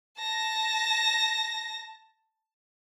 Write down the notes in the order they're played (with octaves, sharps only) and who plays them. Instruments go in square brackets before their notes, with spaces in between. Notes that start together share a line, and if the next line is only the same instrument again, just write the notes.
[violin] A5 A#6